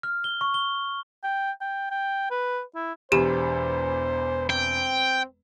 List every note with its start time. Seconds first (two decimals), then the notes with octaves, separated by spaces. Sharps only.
0.03 F6
0.24 G7
0.41 C#6
0.54 G7
1.24 G5
1.61 G5
1.91 G5
2.31 B4
2.75 E4
3.12 E1 E2 G4 C5 E7
4.50 C4 G5